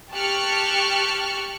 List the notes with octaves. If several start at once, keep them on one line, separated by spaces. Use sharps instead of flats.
G4 A5 C#6 F6 F#6 C#7